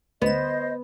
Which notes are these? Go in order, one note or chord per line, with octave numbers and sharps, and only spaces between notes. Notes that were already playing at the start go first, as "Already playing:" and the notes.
D2 B3 C5 D#5 E7